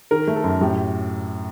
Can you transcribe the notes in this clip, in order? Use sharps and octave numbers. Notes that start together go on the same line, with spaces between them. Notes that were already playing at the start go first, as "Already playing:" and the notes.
D#3 A#4
A3
A4
F#2
A2 G4